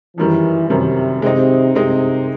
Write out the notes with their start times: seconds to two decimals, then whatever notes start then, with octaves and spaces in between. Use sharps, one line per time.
0.17 F#2 D#3 E3 G3
0.69 F#2 C3 D#3 G3
1.22 C3 G#3 C4 D#4
1.75 C3 G#3 C4 D#4